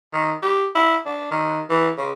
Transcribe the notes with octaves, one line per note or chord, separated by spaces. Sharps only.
D#3
G4
E4
D4
D#3
E3
C#3